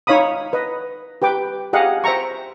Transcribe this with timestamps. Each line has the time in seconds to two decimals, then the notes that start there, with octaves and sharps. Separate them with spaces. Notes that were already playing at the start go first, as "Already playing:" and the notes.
0.07 D#4 C#5 F5 B5 D#6
0.53 B4 D#5
1.22 G4 B4 G5 D6
1.73 G4 G#4 D#5 F5 F#5
2.04 C5 E5 G5 A#5 C#6